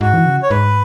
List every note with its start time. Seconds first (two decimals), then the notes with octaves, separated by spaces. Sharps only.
0.01 G#2 F#4
0.14 E3
0.26 C#3
0.43 C#5
0.50 G#2 B4